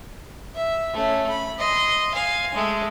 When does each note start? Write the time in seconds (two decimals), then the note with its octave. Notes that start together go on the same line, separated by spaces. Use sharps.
0.55 E5
0.94 A3 C#4
1.29 B5
1.59 D#5 C6
2.14 F5 G#5
2.55 G#3 A3